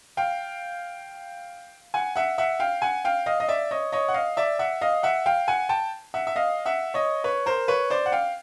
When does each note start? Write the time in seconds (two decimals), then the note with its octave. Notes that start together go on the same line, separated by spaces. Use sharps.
0.17 F5 G5
1.94 F#5 G#5
2.16 E5 F#5
2.38 E5 F#5
2.60 F5 G5
2.82 F#5 G#5
3.05 F5 G5
3.26 D#5 F5
3.40 D#5
3.48 D5 E5
3.71 C#5 D#5
3.92 C#5 D#5
4.09 F#5
4.14 D#5 F5
4.37 D5 E5
4.59 E5 F#5
4.81 D#5 F5
5.03 E5 F#5
5.26 F5 G5
5.48 F#5 G#5
5.69 G5 A5
6.14 E5 F#5
6.27 E5
6.36 D#5 F5
6.65 E5 F#5
6.94 C#5 D#5
7.24 B4 C#5
7.46 A#4 C5
7.68 B4 C#5
7.90 C5 D5
8.06 F#5
8.12 F5 G5